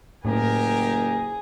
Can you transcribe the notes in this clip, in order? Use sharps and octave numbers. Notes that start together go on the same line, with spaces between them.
F#1 A2 G4 G#4 A#4